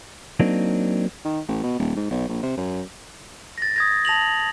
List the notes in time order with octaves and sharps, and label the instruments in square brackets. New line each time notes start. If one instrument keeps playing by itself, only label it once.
[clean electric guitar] F#3 A#3 C4 D4 D#4
[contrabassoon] D#3
A1
B2
D#1
G#2
B1
A#1
C3
F#2
[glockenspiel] A6 A#6
D#6 G#6 A#6
A5 A#6 F7 F#7